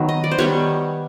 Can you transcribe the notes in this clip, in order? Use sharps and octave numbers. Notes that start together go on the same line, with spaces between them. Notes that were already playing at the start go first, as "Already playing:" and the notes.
Already playing: D#3 F#3 B3
D#5
D5
C5
D#3 G3 B3 C#5